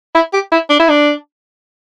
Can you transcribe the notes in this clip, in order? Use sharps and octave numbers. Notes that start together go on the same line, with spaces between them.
E4
G4
E4
D4
E4
D4